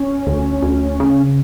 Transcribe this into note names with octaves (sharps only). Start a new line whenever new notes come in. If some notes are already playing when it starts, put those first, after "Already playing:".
Already playing: C#4
D2
D2
C#3